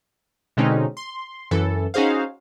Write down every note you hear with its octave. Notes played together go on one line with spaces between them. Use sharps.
B2 D3 G#3 C4 C#4 D#4
C6
F#2 E3 A4
C#4 D#4 F#4 G#4 C5 F5